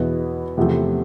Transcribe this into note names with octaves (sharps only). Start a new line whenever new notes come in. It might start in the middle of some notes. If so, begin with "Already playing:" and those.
Already playing: E2 B2 B3 E4
E2 C3 F3 A3